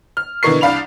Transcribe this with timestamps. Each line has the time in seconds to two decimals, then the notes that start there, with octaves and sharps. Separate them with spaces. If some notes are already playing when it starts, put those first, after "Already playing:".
0.17 F6
0.43 B2 D3 E3 A#4 C#6 C7
0.61 C2 D4 F5 B5 F7